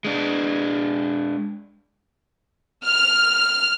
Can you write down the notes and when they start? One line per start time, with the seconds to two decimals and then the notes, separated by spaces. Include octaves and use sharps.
0.05 G#3 D4
2.85 F6